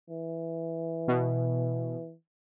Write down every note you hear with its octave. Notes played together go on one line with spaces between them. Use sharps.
E3
B2